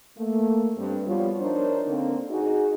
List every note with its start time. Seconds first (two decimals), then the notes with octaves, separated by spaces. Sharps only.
0.17 A3 A#3
0.78 G2 C4
1.07 F3 G3 B3 F4 F#4 C#5
1.40 D4 D#4 A#4 C5 C#5
1.87 D3 A#3 C4
2.30 D#4 F#4 G#4